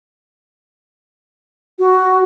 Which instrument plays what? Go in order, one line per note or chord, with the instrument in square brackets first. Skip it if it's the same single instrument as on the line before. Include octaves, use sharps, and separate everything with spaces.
[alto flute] F#4